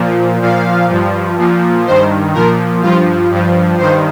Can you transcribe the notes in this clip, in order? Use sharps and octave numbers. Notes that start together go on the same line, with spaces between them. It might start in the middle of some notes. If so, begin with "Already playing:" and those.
Already playing: A#2 F3
A#2 F3 F5
G2 F3
A#2 F3
G2 D#3 C5
A#2 F3 A#4
G2 F3 F4
G2 F3
G2 D#3 C5